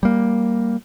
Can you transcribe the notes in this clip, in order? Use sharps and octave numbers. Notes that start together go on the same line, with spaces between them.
G3 A#3